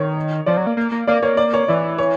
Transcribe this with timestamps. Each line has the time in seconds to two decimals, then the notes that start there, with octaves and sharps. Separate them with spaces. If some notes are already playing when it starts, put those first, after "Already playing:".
Already playing: D#3 C#5
0.46 F3 D5
0.57 F#3
0.67 A#3
0.77 A#3
0.92 A#3
1.07 A#3 D5
1.22 A#3 C#5
1.37 D5
1.54 C#5
1.68 E3 D5
1.98 C#5